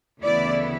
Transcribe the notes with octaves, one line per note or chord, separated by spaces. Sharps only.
D2 C#3 E3 B3 E4 D5